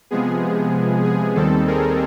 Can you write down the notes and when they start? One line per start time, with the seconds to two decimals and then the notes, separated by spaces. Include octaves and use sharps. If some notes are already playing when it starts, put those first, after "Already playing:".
0.11 C3 F3 G#3 B3 G#4
1.04 G#4
1.35 D#2 D#3 G3 C4 A4
1.67 G#4 A#4